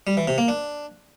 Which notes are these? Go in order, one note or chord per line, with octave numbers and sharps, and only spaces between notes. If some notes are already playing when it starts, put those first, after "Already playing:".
G3
E3
C3
A#3
D4